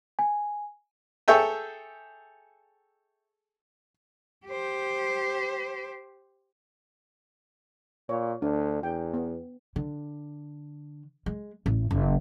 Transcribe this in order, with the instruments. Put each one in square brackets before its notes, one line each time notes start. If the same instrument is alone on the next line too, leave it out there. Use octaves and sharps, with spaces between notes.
[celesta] G#5
[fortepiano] G#4 A4 C#5 E5 G5
[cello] G4 C5
[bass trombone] A#2 [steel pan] C#5
[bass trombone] D2 [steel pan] D4
[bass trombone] E2 [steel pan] G5
[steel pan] B3
[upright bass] D3
G#3
A1
F#1